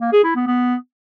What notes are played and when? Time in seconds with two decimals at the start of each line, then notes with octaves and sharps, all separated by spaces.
0.01 A#3
0.13 G#4
0.24 E4
0.36 B3
0.47 B3